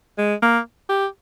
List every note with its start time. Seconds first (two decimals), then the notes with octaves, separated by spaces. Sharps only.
0.18 G#3
0.42 A#3
0.89 G4